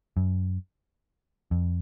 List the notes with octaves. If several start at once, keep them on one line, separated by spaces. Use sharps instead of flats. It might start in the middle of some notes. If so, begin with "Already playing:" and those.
F#2
F2